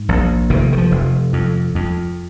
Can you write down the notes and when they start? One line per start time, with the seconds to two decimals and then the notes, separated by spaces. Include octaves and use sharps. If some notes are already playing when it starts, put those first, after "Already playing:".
Already playing: G#2
0.09 A#1
0.50 F1 D#3
0.73 D#3
0.78 F3
0.91 F1
1.33 F2
1.75 F2